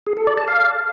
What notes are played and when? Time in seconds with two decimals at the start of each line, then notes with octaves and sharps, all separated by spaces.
0.07 G#4
0.17 A4
0.27 D5
0.37 A5
0.48 F5